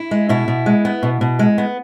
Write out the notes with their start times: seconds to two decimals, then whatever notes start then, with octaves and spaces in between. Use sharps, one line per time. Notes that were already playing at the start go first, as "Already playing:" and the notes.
Already playing: E4
0.11 G#3
0.29 B2 E4
0.48 B2
0.66 G#3
0.85 B3
1.03 B2
1.21 B2
1.39 G#3
1.58 B3